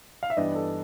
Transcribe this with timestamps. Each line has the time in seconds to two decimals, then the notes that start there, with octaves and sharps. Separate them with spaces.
0.23 F5
0.30 E5
0.37 G2 E3 G3 B3 D4 D#5
0.55 A4